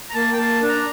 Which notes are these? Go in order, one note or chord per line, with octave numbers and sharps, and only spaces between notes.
A#5
A#3 A5
G5
A#3 A5
D4
A#5